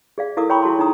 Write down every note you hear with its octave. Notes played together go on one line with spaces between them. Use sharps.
G#4 D5 F5
E4 A4 A#4 F5 D6 D#6
C#5 G5 A#5 B5 C#6
E4 F#4 G#4 A5 C6
D#4 G#4 A#5 D#6